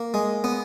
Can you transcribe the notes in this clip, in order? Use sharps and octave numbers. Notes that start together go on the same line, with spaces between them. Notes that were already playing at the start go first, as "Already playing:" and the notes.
Already playing: A#3
G#3
B3